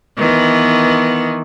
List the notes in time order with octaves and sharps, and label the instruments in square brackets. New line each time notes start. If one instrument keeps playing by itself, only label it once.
[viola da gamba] D#3 E3 B3